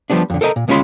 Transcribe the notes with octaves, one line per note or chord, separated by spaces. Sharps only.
F3 G3 B3 D4
F2 D3
A4 A#4 C5 D#5 A#5
A#2
D2 G#3 C#4 F4 B5 C6